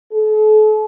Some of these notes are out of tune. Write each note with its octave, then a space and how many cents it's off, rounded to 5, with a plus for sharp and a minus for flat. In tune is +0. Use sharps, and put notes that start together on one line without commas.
A4 -40